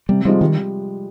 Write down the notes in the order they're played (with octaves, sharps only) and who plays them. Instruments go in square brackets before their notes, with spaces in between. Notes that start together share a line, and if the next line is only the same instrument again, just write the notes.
[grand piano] C3 [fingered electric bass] G3
[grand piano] F3 G#3 C4 F4 [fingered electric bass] G3
[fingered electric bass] D#3 [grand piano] G3